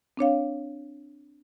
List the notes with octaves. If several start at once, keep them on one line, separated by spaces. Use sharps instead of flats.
C4 D4 C#5 F5